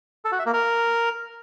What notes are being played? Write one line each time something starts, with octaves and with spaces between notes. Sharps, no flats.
A4
F#4
E5
A#3
A#4